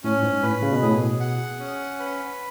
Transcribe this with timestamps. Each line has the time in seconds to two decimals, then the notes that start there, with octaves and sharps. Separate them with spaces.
0.04 A2 C#4
0.23 G#2
0.42 A2 B4
0.62 C#3
0.72 B2
0.82 A2 G#4
0.92 B2
1.20 F#5
1.59 C#4
1.99 B4